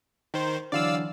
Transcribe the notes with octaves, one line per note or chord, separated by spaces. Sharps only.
D#3 C5
D3 E3 F#3 D5 F5 E6